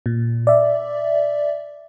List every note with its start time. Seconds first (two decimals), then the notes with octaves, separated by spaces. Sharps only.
0.06 A#2
0.47 D5 E5